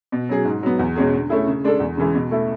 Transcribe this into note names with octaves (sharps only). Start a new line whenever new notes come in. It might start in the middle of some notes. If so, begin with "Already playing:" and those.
B2
F#3 C#4 G#4
G#2
F#3 B3
E2
B2 G#3 C#4 G#4
D3
A3 C#4 E4 G#4
C#3
G#3 D4 A4
E2
C#3 E3 G#3
B2
A3 E4 A4